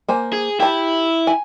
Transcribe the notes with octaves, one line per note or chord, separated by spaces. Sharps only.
A#3 C5 G#5
G#4
E4 G4 A5
G#5